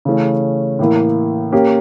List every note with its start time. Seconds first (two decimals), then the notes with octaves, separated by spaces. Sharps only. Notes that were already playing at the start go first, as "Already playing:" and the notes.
0.05 C#3 E3 A3 C#4
0.79 A2 E3 A#3 E4
1.52 A#3 C#4 G4